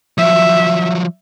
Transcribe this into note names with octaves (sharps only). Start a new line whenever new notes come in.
F3 F#3 E5